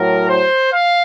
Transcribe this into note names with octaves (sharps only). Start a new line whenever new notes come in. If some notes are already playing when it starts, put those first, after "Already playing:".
Already playing: A2 F#3 A#4
C5
F5